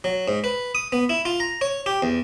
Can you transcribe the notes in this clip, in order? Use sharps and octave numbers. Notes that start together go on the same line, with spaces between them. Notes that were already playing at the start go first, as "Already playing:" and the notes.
F#3
G#2
B4
D#6
B3
E4
F4
A#5
C#5
G4
E2